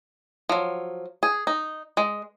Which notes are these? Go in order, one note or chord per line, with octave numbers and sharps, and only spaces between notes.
F3 F#3
G#4
D#4
G#3